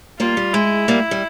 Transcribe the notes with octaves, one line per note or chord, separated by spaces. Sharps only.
G3 A#3 F4
G3
G#3 E4
G3 A#3
G3